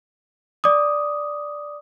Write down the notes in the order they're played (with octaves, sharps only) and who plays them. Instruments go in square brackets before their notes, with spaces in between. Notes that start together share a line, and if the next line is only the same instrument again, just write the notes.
[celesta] D5 D6 D#6